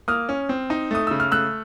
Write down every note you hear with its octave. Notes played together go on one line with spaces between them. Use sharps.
A#3 D#6 F6
C#4
C4
D#4
A3 D#6
C#3 E6
F6
A3 E6 F#6